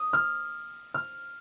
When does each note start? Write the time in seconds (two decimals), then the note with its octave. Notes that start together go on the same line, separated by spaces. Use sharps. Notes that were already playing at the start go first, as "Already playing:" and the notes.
Already playing: D#6
0.13 F6
0.94 F6